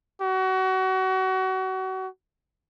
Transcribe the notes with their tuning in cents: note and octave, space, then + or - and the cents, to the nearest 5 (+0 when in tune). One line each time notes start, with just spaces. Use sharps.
F#4 +30